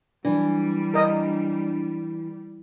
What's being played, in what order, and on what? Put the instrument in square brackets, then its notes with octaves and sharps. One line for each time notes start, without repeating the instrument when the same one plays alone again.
[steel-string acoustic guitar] E3 [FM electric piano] F#3 D4 [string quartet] G3
[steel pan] A#4 D#5